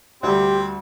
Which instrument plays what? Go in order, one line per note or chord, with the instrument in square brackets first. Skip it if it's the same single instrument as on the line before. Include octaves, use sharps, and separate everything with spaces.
[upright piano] D2 G3 [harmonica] C4 [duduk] G4